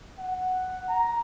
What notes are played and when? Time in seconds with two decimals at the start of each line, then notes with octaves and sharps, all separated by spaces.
0.19 F#5
0.89 A#5